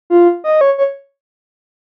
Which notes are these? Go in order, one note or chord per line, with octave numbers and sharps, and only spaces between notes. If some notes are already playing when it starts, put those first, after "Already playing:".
F4
D#5
C#5
C#5